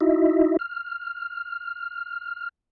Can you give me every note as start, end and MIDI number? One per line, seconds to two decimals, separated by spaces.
0.01 0.57 63
0.01 0.57 64
0.01 0.57 66
0.01 0.57 75
0.01 0.57 76
0.59 2.49 89